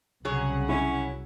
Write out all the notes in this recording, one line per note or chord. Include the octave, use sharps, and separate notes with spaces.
C2 C#3 F#3 G#4 C#5 F#5
C#4 E4